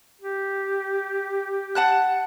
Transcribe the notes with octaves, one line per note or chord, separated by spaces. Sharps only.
G4
F#5 A5 F#6